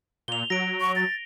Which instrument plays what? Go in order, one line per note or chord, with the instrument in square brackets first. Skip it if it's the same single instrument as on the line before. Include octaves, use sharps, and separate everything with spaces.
[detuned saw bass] A#2 [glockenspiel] F7 G7
[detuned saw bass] F#3 [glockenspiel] A#6 D7
[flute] C#6
A6